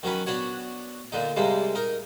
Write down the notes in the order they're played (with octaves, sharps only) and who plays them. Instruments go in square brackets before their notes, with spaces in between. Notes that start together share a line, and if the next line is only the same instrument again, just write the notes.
[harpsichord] D#3 F#3 C#4 B4
B3 D4 F#4 C#5
A#2 D3 D#4
C3 G3 G#3 A#3
D#4 A#4